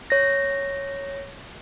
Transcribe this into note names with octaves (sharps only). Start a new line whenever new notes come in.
C#5 A#6